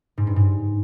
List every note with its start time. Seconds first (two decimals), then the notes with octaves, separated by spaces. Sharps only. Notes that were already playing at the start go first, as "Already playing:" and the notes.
0.17 G#2
0.27 G2
0.36 G#2